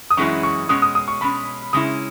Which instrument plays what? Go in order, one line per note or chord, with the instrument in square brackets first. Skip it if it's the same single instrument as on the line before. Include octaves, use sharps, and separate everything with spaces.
[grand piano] D#6
[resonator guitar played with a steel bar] F#2 E3 G#3 C#4 E4 [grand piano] C#6
[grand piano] C#6
[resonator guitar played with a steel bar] B2 G#3 C#4 [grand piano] D#6
[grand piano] D#6
D#6
C#6
[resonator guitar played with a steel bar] B2 G#3 C#4 [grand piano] B5
[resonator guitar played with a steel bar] C#3 G#3 C#4 E4 [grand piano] D#6